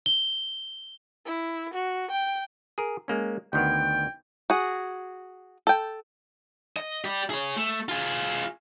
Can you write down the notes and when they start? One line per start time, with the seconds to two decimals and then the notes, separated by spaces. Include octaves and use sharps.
0.06 G7
1.26 E4
1.74 F#4
2.11 G5
2.78 G#4 A#4
3.08 G#3 A#3 C#4
3.53 D2 D#3 B3 G5
4.50 F#4 G#4
5.67 A4 G5
6.77 D#5
7.04 G4 D5
7.30 G#4 C#5
7.57 A3
7.89 F4 G#4